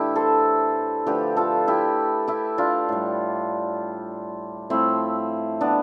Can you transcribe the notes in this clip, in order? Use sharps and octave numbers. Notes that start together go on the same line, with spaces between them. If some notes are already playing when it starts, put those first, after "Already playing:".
Already playing: A2 E3 A3 D4 E4 G4
A4 C5
D3 F3 A3 G4 B4
F4 A4
E4 G4
E4 G4
D4 F4
A2 G3
A2 F3 A3 C4 E4
B3 D4